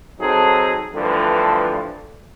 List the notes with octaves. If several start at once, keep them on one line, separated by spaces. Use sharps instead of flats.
F#3 C4 D#4 G#4 A4
G2 D3 E3 F3 A3